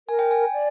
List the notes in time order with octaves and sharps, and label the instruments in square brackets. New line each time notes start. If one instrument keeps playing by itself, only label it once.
[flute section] A#4 [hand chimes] G#5
[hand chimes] G5
G#5
[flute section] D5